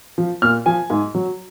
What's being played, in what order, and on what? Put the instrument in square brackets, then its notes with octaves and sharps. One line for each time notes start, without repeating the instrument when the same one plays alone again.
[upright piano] F3
A#2 F6
F3 G#5
G#2
F#3